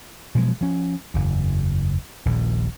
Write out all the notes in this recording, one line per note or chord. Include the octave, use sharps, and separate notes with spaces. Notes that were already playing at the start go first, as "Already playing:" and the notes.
B2 F3 F#3 G#3
F3 C#4
F#1 E2
D#1 A#1 A#2